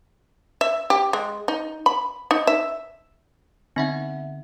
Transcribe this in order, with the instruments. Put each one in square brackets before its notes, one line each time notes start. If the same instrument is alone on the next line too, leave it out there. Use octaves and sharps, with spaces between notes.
[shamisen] E5
G4
G#3
D#4
B5
D#4
E5
[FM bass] D3 [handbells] B3 E5 F#5 [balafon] C4 D#4